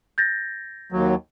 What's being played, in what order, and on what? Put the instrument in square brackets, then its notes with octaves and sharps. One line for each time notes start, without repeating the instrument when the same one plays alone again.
[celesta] G6 A6 A#6
[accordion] D#2 F#3